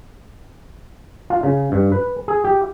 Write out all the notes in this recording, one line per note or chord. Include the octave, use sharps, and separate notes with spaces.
F4
C#3
G2
B4
G#4
G4